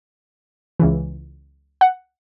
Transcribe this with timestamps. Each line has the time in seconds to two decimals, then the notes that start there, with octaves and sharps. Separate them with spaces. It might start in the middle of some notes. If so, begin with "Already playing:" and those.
0.80 C#2 C#3 E3
1.81 F#5